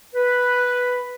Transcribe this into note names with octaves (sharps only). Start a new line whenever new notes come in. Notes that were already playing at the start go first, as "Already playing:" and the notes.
B4